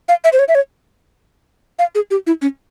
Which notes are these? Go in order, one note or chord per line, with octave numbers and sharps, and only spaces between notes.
F5
E5
C5
C#5
E5
C#5
F5
G#4
G4
E4
C#4